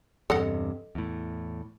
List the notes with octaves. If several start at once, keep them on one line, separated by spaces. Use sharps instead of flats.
E2 G2 C3 A4 D#5 F#5
E2 A2